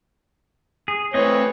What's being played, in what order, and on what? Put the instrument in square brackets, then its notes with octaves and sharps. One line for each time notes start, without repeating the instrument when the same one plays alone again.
[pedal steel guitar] G#4
[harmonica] E3 B4 C#5 [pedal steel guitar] A3 C4 D#5